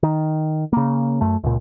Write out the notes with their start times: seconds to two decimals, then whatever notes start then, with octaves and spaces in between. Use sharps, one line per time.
0.03 D#3
0.73 C#3 A#3
1.21 F#2 A3
1.44 C#2 A#2